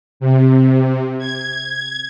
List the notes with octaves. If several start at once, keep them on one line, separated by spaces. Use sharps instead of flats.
C3
G#6